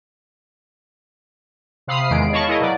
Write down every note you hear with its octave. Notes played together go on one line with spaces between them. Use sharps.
C3 F5 B5 D#6 C7
E2 D#3 G#3 D7
C#5 D#5 F5 A5 B5 C#6
E4 G#4 A#4 D#5
B2 F#3 D5